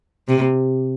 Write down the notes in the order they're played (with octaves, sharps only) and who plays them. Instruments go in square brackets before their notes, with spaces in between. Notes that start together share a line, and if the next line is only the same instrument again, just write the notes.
[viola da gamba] C3